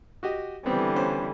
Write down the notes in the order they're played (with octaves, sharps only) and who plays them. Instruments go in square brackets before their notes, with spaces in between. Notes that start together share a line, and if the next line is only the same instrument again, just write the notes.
[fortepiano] F#4 G4 D#5
[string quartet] D3 E3 G3 [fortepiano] B3 C4
[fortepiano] B3 C#4 C5